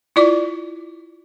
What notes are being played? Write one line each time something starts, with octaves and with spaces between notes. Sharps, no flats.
E4 F4 D5 D6